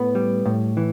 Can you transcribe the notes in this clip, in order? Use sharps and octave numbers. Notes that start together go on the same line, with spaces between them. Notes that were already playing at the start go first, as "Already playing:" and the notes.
Already playing: A2 B3
G3
A2
E3